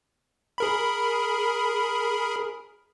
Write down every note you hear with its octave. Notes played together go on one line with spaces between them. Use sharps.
G#4 A#4 B5